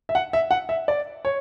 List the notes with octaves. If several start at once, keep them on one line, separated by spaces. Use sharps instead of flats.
E5
F#5
E5
F#5
E5
D5
C#5